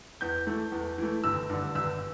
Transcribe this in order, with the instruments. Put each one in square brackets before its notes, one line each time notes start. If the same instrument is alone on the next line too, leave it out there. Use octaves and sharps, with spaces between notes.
[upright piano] E2 G6
E3 A3
E2
E3 A3
G1 E6
G2 D3
G1 E6